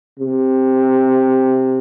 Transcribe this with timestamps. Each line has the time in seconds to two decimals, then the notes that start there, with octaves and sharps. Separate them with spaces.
0.19 C3